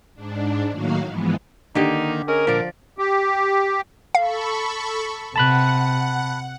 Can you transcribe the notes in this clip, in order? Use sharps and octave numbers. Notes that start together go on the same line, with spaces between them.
G#2 D4
A2 D#3 F#3 A#3 F#4 F5
G#2 E3 F3 G#3 B3
D3 D#3 A#3 D#4 G4
C#4 G#4 A#4 D#5
A#2 D3 F3 D5
G4
A4 F5 B5 C#6
C3 F#5 A5 B5 F#6